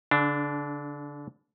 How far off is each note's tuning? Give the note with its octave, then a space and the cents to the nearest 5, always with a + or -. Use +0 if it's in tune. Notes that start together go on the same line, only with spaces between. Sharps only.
D3 -35 D4 +0